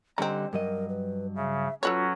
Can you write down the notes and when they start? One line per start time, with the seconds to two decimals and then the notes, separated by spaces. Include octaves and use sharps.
0.18 D3 G3 C4 C#4 D#5 A#5
0.53 G2 F#3 A#4 D#5
0.89 B4
1.36 C#3 E5
1.83 F#3 C#4 F4 F#4 A4 B4 C#5